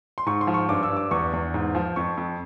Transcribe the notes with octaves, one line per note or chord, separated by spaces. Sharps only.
C6
G#2 C#6
C6
F3
C#6
G2 D6
E6
G2
D6
E2 C#6
E2
G#2
F3
F2 C#6
F2